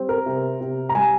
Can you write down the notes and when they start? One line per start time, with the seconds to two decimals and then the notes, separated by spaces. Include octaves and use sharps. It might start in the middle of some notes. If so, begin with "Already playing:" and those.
Already playing: G3 C4
0.09 A#4
0.26 C3
0.61 C3
0.89 A#5
0.95 G3 G#5